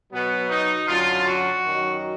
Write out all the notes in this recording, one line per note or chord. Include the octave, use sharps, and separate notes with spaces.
B2 F#3 B3
D#4
F#2 D3 F#3 F4
F#4
F#2 D#3 F#3